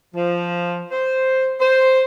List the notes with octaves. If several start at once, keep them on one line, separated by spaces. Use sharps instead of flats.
F3
C5
C5